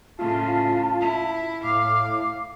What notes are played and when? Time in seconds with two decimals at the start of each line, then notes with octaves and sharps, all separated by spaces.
0.19 A2 C#3 F4 A5
1.00 E4
1.64 A2 F5 D6